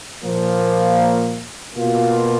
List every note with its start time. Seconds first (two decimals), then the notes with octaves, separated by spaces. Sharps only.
0.22 A#2 F3 A#3
1.76 B2 A#3 F4